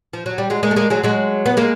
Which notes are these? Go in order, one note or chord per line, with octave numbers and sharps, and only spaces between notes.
F3
F#3
G3
F#3 G#3
G#3 A#3
A3
G#3 A#3
F#3 G#3
F#3 G#3
B3
G#3 A#3